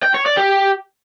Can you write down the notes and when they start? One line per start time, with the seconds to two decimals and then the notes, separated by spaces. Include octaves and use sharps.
0.03 G5
0.14 C#5
0.26 D5
0.37 G4